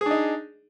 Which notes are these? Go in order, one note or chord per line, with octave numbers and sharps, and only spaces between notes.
D4 D#4 G#4